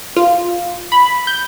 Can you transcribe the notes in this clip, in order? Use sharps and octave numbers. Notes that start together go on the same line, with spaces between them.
F4
B5
G6